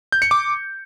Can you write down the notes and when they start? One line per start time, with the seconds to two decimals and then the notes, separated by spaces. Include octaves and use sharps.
0.12 G6
0.22 C#7
0.31 D6